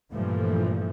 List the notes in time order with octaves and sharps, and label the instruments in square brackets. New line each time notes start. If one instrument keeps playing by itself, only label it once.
[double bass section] G2 A#2 E3 F3 A3